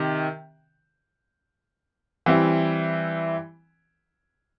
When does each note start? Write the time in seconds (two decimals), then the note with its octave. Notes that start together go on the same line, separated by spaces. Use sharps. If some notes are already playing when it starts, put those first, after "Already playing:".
Already playing: C3 D#3
2.26 E3 G3 C4 E4